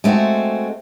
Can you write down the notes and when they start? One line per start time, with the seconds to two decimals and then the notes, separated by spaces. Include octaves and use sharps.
0.04 G#3 A3 C4 F#4